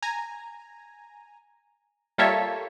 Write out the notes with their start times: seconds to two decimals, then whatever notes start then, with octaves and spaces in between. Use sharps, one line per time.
0.02 G#5 A#5
2.18 G3 A#3 F4 A4 C#5 E5